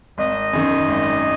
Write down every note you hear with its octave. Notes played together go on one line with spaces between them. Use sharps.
G#1 D#5
F#2 D#3
G#1